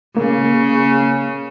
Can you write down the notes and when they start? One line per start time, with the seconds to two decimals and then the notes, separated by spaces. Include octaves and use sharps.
0.17 C#3 A#3